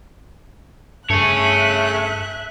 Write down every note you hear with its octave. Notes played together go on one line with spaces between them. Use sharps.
G2 A3 G#4 C#5 E5 F#6